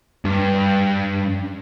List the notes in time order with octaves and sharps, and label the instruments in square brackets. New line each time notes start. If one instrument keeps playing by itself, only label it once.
[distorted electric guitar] G2